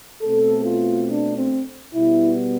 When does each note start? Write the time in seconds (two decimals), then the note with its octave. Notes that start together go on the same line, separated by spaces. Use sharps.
0.22 B2 A3 C4 A4
0.65 F4
1.09 D4
1.38 C4
1.94 B2 G3 B3 E4